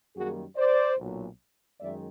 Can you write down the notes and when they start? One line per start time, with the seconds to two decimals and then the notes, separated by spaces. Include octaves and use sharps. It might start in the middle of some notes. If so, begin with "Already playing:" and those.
0.16 F#2 D#3 G3 A#3 F#4 G#4
0.57 C5 D5
0.98 B1 A#2 F#3
1.80 F#2 D#3 G#3 D5 E5